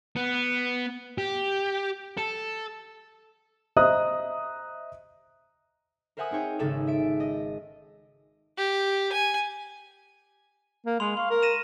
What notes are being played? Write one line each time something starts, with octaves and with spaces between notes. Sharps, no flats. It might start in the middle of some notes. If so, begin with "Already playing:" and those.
B3
G4
A4
C5 D#5 E5 A#5 D#6 F#6
A#4 C5 E5 F#5 G#5 D#6
C4 D#4 G#4 C#5 G5
G#1 C#3 D#4 G#4 A4 E7
E5 D7
D#5
G4
G#5
A#3
G#3 B5 C6 F7
F5 C6 C#6
A#4
A#6 D#7 E7